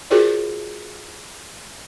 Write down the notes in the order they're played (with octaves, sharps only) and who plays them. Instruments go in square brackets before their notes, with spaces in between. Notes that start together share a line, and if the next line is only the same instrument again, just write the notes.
[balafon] F4 F#4 G#4 A#4 C5 D5